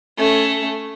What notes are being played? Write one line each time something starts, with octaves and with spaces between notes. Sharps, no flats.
A3 C#4